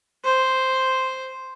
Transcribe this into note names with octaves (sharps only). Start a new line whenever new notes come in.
C5